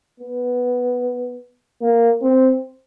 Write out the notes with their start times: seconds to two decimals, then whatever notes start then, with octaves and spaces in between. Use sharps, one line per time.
0.20 B3
1.82 A#3
2.22 C4